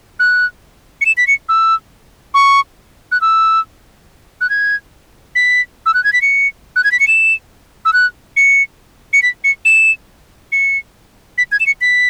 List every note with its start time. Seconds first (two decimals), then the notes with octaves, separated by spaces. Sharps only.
0.19 F#6
1.01 C#7
1.06 E7
1.17 B6
1.27 C#7
1.49 E6
2.34 C#6
3.12 F#6
3.21 E6
4.41 F#6
4.50 G#6
5.35 B6
5.86 E6
5.94 F#6
6.04 G#6
6.13 B6
6.22 C#7
6.76 F#6
6.84 G#6
6.92 B6
7.00 C#7
7.07 E7
7.85 E6
7.93 F#6
8.36 C#7
9.13 C#7
9.22 B6
9.44 C#7
9.65 E7
10.52 C#7
11.38 B6
11.52 G#6
11.60 E7
11.66 C#7
11.81 B6